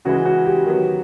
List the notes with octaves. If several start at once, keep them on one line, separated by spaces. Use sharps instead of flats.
C#3 E3 G#3 F#4
F#4
G4
D#3 F#3 B3